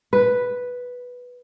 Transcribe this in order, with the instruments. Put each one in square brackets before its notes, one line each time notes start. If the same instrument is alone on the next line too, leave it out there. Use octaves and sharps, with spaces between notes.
[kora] B4